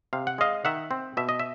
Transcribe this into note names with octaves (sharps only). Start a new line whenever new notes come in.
C3 F5
F#5
G#3 D#5 F5
D#3 E5 F#5
C4
B2 E5
D#5
E5